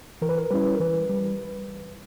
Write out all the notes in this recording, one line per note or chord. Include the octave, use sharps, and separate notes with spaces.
E3 A#4
B4
A#4
G3 C#4 E4 B4
A#4
E3 B4
G3